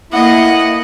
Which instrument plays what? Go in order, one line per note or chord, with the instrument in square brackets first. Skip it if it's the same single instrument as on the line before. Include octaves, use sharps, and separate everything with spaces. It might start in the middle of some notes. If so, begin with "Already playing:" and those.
[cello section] A3 A#3 [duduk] E4 [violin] D#5 F#5